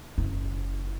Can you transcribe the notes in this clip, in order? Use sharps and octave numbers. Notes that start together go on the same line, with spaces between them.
F#1 E4